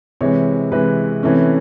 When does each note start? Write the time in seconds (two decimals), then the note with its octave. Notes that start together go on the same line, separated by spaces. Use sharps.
0.21 C3 E3 G#3 C#5
0.72 C3 E3 G#3 B4
1.23 C3 E3 A3 C#4